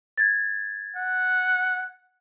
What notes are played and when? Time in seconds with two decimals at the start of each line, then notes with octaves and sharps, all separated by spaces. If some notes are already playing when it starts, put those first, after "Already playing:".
0.18 G#6 A6
0.96 F#5